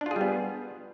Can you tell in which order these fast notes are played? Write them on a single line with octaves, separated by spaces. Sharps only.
D4 F4 G#4 G3 B3